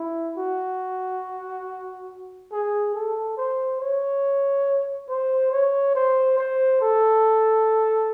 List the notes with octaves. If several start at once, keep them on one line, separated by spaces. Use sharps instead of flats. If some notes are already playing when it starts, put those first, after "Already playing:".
Already playing: E4
F#4
G#4
A4
C5
C#5
C5
C#5
C5
C5
A4